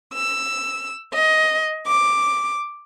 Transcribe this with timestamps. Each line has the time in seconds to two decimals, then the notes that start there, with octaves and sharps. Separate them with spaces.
0.13 E6
1.13 D#5
1.85 D6